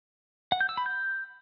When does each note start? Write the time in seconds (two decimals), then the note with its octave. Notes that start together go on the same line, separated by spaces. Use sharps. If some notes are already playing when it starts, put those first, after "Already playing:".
0.52 F#5
0.61 G6
0.69 E6
0.77 B5
0.86 G6